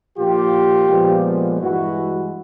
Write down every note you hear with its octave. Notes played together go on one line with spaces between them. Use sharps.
A#2 F3 A#3 F4 G4
A#2 F3 G#3 B3
G2 E3 G#3 E4 F#4